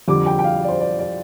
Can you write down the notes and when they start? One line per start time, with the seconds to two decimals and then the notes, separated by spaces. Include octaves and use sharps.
0.08 F2 D3 G3 D6
0.26 G5
0.39 G5
0.44 F5
0.64 D5
0.69 C5
0.81 D5
0.99 D5